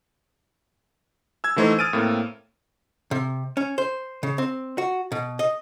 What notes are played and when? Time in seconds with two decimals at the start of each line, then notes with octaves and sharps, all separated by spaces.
1.44 E6 G#6
1.56 D3 E3 A3 D#4 C5
1.79 D#6 F6 A6 D7 D#7
1.93 A2 A#3 C4
3.11 C3
3.57 C#4
3.78 C5
4.23 C#3
4.38 C4
4.78 F#4
5.12 B2
5.39 D#5